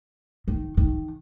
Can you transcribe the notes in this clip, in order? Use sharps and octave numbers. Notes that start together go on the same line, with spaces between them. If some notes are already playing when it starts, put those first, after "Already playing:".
D#3
D#3